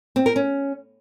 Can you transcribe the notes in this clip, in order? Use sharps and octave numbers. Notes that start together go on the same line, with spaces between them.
C4
A#4
C#4